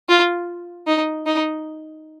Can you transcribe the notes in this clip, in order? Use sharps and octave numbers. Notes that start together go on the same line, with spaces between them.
F4
D#4
D#4